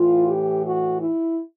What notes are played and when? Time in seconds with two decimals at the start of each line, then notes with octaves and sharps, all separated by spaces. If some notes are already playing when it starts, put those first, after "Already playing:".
Already playing: A2 E3 F4
0.26 G4
0.64 F#4
1.01 E4